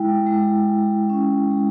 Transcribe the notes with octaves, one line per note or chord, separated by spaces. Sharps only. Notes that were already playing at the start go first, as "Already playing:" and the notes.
Already playing: G#3 E4 G5
G#3
G#3
C#4
G#3